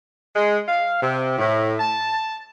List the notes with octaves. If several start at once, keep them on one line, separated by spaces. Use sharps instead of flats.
G#3
F5
C3
A2
A5